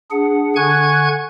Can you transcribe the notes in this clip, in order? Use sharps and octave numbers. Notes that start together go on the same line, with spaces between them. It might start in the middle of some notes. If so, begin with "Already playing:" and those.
D4 G#4 F#5
D3 F#5 G#5 C#6 F#6 G#6